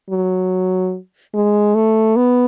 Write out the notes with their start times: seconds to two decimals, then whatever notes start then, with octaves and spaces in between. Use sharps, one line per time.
0.10 F#3
1.34 G#3
1.75 A3
2.16 B3